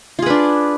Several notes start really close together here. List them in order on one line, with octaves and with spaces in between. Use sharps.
F4 G#4 B4 D4